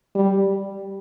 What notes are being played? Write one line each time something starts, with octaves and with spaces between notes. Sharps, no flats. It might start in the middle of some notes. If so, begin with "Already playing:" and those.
G3